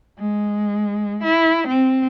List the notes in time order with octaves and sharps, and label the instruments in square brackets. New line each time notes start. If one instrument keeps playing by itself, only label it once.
[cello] G#3
E4
C4